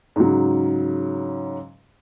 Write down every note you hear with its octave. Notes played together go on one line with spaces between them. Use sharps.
G#2 C#3 F#3